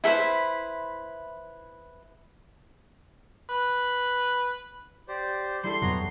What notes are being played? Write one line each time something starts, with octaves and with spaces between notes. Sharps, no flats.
E4 A4 B4 C5
B4
G4 C5 D5
G3 E4 A4 C6
E2 F#3 B3 A#5 C7